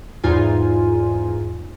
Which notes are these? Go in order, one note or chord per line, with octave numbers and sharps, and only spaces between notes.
E2 G#2 D#4 F4 G#5